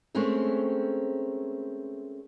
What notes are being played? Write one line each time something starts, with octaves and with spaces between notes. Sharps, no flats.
G#3 A3 C4 C#4 A#4